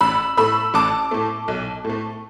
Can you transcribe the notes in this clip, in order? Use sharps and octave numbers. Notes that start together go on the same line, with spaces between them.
A1 B5 E6
A2 A3 B5 E6
A1 A5 D6
A2 A3
B1
A2
A3